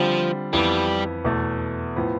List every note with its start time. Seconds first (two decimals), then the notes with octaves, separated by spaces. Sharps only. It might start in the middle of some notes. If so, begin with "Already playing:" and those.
Already playing: D3 F3 G3 C4 F4
0.53 F2 E3 G3 B3
1.25 E2 B2 A3
1.96 A2 F3 B3